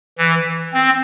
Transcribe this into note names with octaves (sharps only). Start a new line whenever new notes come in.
E3
C4